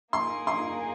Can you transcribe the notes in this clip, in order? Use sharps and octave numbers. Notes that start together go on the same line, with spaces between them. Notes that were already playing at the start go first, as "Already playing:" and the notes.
A#3 D#4 G#4 C6
C6